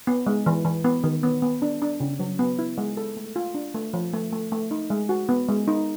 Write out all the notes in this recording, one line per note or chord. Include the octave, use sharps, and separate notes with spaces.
B3
G#3
E3
E3
B3
D#3
B3
B3
D4
D4
C#3
F#3
B3
E4
G#3
A4
A3
F4
D4
A3
F3
A3
A3
A3
D#4
G#3
F#4
B3
G#3
D#4